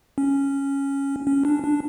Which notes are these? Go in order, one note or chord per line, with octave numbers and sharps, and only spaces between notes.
C#4
C#4
D4
D4